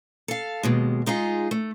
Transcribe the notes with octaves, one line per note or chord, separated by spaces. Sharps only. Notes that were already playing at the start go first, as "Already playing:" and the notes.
A4 F5
D#2 B2 G#3
G#3 D#4 F4 G#4
A3